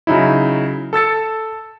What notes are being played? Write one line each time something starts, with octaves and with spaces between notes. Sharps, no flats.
C#3 F#3 D#4 E4
A4 E6 A6 C#7